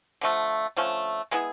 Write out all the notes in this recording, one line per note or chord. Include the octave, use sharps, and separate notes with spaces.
D3 F3 A3
D3 F3 A3 C#4
G#3 B3 E4 G#4